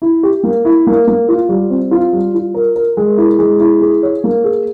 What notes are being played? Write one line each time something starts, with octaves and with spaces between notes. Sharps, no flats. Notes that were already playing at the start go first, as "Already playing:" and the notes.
E4
G4
A#3
E4
A#3
A#3
F4
G3
C4
F4
G3
F4
A#4
A#4
G#3
E4
G#3
E4
G#4
C#5
A#3
G#4